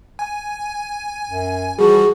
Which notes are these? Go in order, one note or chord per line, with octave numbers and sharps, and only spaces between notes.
G#5
F#2
E3 F3 G3 F#4 G#4